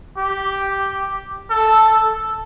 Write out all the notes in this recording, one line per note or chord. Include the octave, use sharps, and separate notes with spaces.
G4
A4